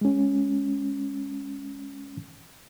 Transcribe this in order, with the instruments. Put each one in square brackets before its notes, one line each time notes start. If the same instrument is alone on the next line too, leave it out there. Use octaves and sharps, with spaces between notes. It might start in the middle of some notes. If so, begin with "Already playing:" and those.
[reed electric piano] G#3 C#4